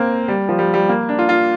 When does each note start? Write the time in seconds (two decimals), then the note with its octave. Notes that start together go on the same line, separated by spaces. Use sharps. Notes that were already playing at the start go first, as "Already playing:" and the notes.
Already playing: A#3 C4
0.28 G3
0.49 F3
0.59 G3
0.74 G3
0.89 A#3
1.09 D4
1.19 F4
1.29 F4